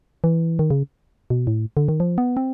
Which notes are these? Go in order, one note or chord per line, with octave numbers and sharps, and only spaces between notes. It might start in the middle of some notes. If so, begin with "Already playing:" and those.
E3
D#3
C#3
B2
A2
D3
D#3
F3
B3
C4